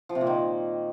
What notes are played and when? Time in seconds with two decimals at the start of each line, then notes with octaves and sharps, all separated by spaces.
0.09 F3
0.15 C3
0.21 A#2
0.27 D#3